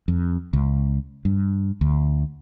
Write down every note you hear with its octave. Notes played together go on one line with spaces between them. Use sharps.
F2
C#2
G2
D2